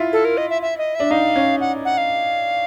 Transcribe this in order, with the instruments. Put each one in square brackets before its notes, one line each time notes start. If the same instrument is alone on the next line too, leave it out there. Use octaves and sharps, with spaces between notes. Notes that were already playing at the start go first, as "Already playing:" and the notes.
Already playing: [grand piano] E4 F4
[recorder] A4
A#4
D#5
E5
E5
D#5
[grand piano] D4 [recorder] E5
[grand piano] D#4 [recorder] F5
[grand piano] C#4
[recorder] F#5
F#5
F5